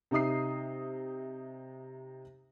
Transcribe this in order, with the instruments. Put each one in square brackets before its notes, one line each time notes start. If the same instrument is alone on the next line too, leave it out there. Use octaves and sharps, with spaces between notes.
[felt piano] C3 D#4 E5 D#6 C7